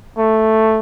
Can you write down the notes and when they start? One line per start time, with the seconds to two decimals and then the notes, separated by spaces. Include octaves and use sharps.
0.18 A3